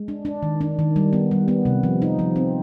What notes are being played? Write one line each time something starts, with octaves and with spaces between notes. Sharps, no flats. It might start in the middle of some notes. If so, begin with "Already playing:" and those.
Already playing: G#3
D4
D4
D#3
D4
D#3
G3
B3
G3
B3
C3
F3
D#4
F3
C4